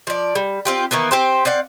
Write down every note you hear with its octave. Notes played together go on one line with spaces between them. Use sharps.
F3 D5
G3
C4 F4 G4
D#3 E3 A#3 B3
C4 G4 C5
C4 D5 F5 F#5